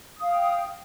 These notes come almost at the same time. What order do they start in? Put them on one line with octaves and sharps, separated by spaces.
D#6 F5 G5